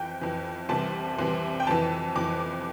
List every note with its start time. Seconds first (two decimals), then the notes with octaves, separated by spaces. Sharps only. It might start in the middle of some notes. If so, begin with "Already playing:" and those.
Already playing: F2 E3 G5
0.21 F2 E3
0.69 C2 C3 E3 A5
1.19 C2 C3 E3
1.60 G5
1.67 F2 E3 A5
2.16 F2 E3 D6